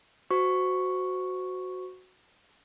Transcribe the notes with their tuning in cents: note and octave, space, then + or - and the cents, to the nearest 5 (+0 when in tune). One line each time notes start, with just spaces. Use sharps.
F#4 +0 C5 -25 C#6 +0